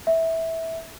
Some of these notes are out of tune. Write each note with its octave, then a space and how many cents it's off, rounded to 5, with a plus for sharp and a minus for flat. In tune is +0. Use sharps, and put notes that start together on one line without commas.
E5 -15